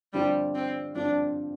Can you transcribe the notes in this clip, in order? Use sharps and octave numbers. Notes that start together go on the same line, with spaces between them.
G2 D3 F3 G3 C4 F4
C4
G2 D3 F3 C4 D4 F4